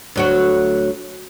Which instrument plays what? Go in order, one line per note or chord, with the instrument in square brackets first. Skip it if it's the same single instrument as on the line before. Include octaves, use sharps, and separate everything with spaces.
[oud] D2 F#3 F#4